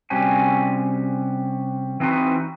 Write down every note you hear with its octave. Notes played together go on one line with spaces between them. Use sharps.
C3 G3 C#4 F#4 G4 G#5
E3 C4 D#4 F#4 B4